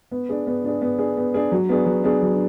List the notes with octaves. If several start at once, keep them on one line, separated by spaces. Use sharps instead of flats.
B3
D4 G#4
B3
D4 G#4
B3
D4 G#4
B3
D4 G#4
F#3
B3 D4 G#4
F#3
B3 D4 G#4
F#3